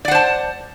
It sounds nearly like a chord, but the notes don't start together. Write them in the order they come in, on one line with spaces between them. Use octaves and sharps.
D5 F#5 C5 A5